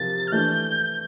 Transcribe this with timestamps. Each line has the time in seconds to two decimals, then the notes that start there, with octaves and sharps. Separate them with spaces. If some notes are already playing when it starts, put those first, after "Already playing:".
Already playing: C3 F3 C4 F4 A#4 A6
0.28 F6
0.32 E3 A3 D4 G6